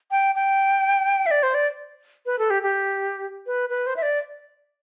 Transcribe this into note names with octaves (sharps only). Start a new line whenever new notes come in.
G5
G5
E5
D5
C5
D5
B4
A4
G4
G4
B4
B4
C5
E5
D5